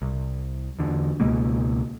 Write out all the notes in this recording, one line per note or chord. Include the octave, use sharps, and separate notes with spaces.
C2
E2 D3
C#2 B2 G#3 A#3